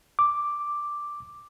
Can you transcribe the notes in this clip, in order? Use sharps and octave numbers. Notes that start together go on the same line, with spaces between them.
D6